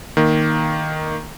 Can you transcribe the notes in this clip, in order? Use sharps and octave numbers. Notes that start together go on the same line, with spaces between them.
D#3 A#3